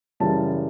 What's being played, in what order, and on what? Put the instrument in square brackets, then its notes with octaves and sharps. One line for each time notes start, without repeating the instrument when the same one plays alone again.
[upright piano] F#2 C#3 E3 G3 A5